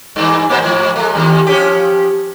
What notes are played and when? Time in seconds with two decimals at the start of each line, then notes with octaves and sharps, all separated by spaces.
0.16 G2 E3
0.49 A#2 A#3 C5
0.62 G#2 F3
0.96 G#3 A3
1.13 D#2 G#2 G3
1.47 F3 C#4 G4